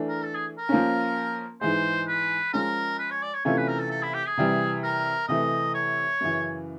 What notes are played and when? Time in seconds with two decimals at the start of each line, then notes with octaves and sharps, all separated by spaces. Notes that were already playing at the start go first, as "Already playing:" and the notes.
Already playing: E3 A3 D4
0.08 A#4
0.23 A4
0.36 G#4
0.58 A#4
0.69 F3 A#3 C#4
1.61 G#2 E3 G#3 C5
2.08 B4
2.53 F3 G#3 C#4 A#4
2.99 B4
3.11 C#5
3.22 D5
3.34 C#5
3.45 C3 E3 A3 C#4 F4 C#5
3.57 B4
3.69 A#4
3.80 A4
3.91 A4
4.03 E4
4.14 G4
4.26 G#4
4.38 C3 E3 G3
4.83 A#4
5.28 C3 E3 A3 D#5
5.74 C#5
6.21 F#2 C#3 E3